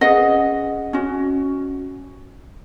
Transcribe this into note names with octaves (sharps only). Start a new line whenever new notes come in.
C#4 G#4 B4 D#5 F#5
C#4 F#4